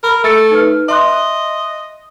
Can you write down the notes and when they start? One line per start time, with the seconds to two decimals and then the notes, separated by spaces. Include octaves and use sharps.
0.04 A#4 B5
0.24 A3 E6 A6 C#7
0.51 D#4 B4 F6
0.89 D#5 E5 C6 F#6